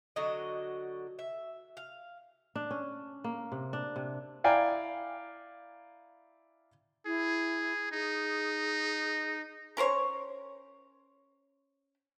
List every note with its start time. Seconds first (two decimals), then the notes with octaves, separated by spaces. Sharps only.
0.16 D3 F#3 F#4 D#5
1.19 E5
1.77 F5
2.55 D4
2.71 C#4
3.24 A#3
3.52 C3
3.73 D4
3.96 C3
4.44 E4 D5 F5 G5 G#5 A#5
7.06 E4 G#4
7.92 D#4 G#4
9.77 C#4 A#4 C5 C#5